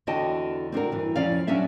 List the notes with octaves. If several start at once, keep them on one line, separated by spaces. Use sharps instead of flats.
E2 D3 F#4 D#5 G5 A5
C4 D4 F#4 A#4
G2 E3
F2 F3 C#4 D5 F5
F#3 G3 C#4 D4 E5